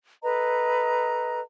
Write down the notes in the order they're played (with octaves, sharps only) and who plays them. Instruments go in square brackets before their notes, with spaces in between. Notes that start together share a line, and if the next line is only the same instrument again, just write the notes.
[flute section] A4 B4 D#5 A#5